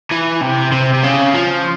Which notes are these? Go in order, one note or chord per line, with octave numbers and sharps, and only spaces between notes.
E3
C3
C3
C3
C#3
F3